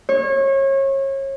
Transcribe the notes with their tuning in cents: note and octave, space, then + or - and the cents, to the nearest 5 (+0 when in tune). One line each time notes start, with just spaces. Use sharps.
C#5 -30